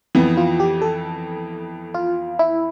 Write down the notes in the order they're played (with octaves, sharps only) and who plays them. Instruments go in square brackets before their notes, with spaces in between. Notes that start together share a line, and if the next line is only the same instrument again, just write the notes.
[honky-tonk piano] F2 E3 B3
[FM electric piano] F4
G4
A4
F4
E4